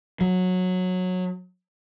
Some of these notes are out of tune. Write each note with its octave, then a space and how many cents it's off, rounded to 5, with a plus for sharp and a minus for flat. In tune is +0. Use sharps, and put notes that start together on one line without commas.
F#3 -15